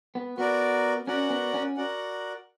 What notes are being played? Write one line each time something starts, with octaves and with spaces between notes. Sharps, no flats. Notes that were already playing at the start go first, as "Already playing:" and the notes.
B3
B3 F#4 A#4 D5
C#4 F#4 A#4 D5 F#5
B3
C#4
F#4 A#4 D5 F#5